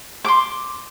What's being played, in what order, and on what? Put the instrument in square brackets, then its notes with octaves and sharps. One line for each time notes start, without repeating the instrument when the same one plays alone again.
[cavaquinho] C6 D6